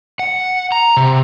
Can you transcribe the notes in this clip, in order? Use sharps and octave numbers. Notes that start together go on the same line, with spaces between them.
F#5
A#5
C3